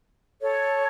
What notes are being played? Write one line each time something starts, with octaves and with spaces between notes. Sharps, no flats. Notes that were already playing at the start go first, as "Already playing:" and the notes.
A4 C#5